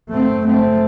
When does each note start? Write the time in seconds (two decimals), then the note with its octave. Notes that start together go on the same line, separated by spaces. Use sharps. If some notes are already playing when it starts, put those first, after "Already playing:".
0.12 F#2 C#3 A3 C4
0.47 A3 C4